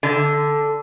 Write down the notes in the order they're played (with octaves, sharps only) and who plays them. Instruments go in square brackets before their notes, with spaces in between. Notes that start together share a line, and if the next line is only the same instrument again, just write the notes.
[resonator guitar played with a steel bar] D3